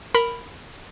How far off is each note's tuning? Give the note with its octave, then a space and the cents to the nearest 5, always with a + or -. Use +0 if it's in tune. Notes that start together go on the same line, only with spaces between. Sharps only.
A#4 +0 B5 +0